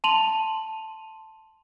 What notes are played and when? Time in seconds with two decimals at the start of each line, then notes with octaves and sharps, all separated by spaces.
0.04 A5 C6 D#7 F7 F#7